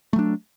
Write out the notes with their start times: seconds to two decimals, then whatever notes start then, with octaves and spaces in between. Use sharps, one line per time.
0.13 A3
0.16 F#3
0.19 D4